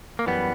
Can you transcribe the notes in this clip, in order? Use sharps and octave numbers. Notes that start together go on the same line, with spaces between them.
A#3
F#2 E3 G3 B3